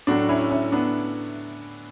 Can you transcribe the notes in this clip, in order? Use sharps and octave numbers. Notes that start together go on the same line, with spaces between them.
A2 F#3 A3 D4 F#4
C#4 E4
C#4 E4
B3 D4